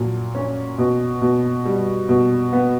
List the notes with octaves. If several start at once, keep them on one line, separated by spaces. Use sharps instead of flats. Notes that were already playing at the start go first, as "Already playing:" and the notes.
Already playing: A#2 F#3
C#4
B2
B2
G3
B2
B3